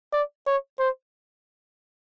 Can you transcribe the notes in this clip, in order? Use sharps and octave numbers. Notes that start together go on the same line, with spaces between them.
D5
C#5
C5